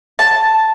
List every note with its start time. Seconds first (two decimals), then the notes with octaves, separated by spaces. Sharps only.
0.19 A5